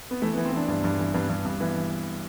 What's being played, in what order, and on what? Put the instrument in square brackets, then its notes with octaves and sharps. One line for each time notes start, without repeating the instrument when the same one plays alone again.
[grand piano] B3
E3 A3
B3
E3
C4
E3 D4
G2 D4
G2
E3
G2 B3
G2
G2
E3 B3
E3